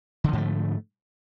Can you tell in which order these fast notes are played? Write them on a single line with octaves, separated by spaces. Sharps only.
D3 F3 G#2 A3